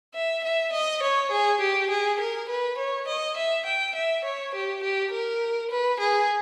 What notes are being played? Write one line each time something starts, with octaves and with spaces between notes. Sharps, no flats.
E5
E5
D#5
C#5
G#4
G4
G#4
A#4
B4
C#5
D#5
E5
G5
E5
C#5
G4
G4
A#4
B4
G#4